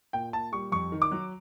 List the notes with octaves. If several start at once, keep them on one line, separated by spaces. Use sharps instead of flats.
A#2 G5
A#2 A5
G3 C#6
F2 C#6
D#3
D6
F#3